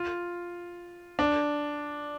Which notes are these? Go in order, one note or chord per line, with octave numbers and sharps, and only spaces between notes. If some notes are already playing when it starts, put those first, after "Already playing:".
Already playing: F4
D4